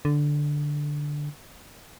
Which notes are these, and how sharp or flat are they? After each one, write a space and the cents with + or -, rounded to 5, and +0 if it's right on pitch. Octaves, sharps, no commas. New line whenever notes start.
D3 +0